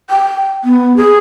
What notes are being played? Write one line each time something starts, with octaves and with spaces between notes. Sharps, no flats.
G5
B3
G#4